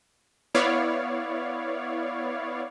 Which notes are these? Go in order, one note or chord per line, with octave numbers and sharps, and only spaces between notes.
B3 E4 C#5 D5 F5